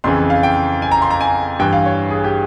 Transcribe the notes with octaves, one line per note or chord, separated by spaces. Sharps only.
F2 C#3 E3 C6
F5
G5
G#5
A#5
C6
A#5
G#5
G2 E3 G5
F5
C#5
G#4
G4